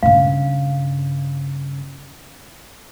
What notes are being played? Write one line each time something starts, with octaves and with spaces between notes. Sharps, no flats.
G2 C#3 F5